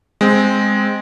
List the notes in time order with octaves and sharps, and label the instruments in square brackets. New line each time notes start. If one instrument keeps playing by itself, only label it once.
[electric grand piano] G#3 C4